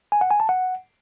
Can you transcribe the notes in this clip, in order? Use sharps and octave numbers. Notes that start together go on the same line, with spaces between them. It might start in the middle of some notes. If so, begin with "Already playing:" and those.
G#5
F#5
G#5
A5
F#5